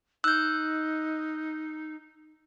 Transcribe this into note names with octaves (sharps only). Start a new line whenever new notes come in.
D#4 E6 F#6 G6